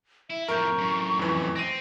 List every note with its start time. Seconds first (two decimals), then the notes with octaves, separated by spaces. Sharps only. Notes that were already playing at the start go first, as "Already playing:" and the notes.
0.30 E4 E5
0.48 F2 A2 A#4 C#6 G6
0.78 F#2 A2
1.19 F2 E3
1.56 C4 A#6 D#7